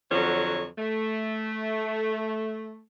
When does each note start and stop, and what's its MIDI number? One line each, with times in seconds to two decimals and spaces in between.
0.11 0.65 41
0.11 0.65 50
0.11 0.65 53
0.11 0.65 54
0.11 0.65 73
0.78 2.80 57